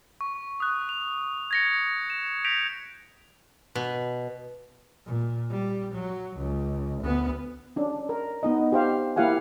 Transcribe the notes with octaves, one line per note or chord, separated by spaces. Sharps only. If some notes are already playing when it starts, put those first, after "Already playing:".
C#6
D#6 F#6
F7
G#6 A#6 C#7
E7
G6 A#6 B6 D7 F7
B2
A#2
G3
F#3
C#2
D2 B3
C#4 D4
A#4
B3 D#4 D#5
G4 C5 F5
A#3 E4 G4 F5 F#5 G#5